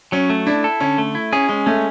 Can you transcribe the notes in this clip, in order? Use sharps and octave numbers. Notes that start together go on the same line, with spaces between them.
F#3 C#4
A3
D4 E4
A4
D3 C#4
A3
E4
C#4 G#4
G#3 C#4
A3 C#4